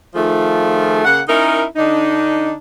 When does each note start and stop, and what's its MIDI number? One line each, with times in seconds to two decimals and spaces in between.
0.14 1.00 51
0.14 1.00 53
0.14 1.00 57
0.14 1.00 65
0.14 1.00 68
1.05 1.21 49
1.05 1.21 58
1.05 1.21 78
1.28 1.64 61
1.28 1.64 63
1.28 1.64 64
1.28 1.64 70
1.76 2.52 50
1.76 2.52 62
1.76 2.52 63